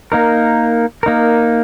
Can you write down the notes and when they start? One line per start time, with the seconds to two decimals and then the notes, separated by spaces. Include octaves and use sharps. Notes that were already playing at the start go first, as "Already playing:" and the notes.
0.12 A#3 D#4 A#4
1.03 A#3 D#4 A#4